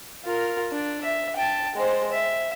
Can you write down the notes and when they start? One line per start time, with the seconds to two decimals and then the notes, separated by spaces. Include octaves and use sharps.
0.24 F4 A#4
0.71 D4
1.03 E5
1.36 G5 A5
1.76 G#3 C5
2.12 E5